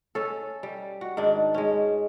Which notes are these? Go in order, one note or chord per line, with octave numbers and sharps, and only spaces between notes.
C#4 A4
G3
F#4
G#2 D#3 D4
G#3 C#4